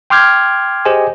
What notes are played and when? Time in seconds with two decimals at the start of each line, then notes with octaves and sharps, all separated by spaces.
0.10 G5 C6 D6 F6 G6 G#6
0.85 G4 G#4 C5 D#5 G#5